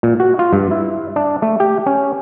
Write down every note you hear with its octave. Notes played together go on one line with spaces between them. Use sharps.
A#2
F#4
F4
G2
E4
D4
A3
G4
C#4